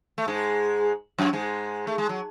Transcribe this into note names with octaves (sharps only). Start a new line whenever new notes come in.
A3
G#2 G#3
F#2 F#3
G#2 G#3
A3
G#3
F#3